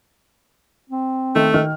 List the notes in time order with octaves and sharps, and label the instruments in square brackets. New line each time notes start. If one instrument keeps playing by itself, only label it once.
[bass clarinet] C4
[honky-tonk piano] D#3 [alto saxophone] A3
[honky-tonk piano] D#3 F6